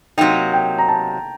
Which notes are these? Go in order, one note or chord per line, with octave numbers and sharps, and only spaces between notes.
C3 F#3 A#3 D#4 G5
G5
A#5
A5